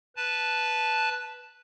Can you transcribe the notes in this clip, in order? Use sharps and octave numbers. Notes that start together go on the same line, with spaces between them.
B4 A5